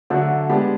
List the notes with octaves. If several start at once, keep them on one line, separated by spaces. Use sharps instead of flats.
D3 F#3 A3 D4 F#4
G#3 B3 D4 G4